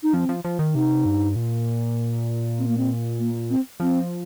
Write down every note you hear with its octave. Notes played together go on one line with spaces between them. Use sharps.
D#4
F3 C4
F3
F3
D#3
C3 D#4
G2
A#2
C4
A#3
C4
A#3
C4
F3 C4